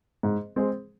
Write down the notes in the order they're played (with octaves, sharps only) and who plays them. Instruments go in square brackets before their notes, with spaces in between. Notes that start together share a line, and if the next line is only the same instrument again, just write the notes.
[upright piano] G#2
G#3 C4 G#4